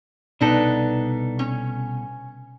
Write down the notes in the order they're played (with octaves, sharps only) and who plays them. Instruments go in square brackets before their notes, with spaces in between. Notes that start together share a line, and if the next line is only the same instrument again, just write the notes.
[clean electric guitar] C2 B2 A4 [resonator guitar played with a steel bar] D4 D#4 B4
[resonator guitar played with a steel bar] C#4